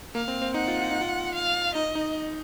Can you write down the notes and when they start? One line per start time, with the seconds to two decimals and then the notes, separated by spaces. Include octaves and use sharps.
0.15 A#3 F5
0.28 C4
0.42 C4
0.54 D#4 F#5
0.68 F4
0.81 F4
0.91 D#4
1.01 F4
1.35 F5
1.75 D#4 D#5
1.95 D#4